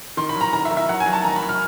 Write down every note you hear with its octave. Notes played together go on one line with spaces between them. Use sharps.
D#3 C6
B5
F#3
A#5
D#3 A#5
E5
D#3
E5
F#3 F#5
G#5
F#3
A5
D#3 A#5
B5
F#3
F6